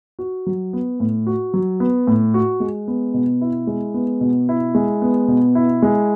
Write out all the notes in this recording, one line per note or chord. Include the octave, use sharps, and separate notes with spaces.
F#4
F#3
B3
A2
F#4
F#3
B3
A2
F#4
G#3
B3
B2
E4
G#3
B3
B2
E4
G#3
B3
B2
E4
G#3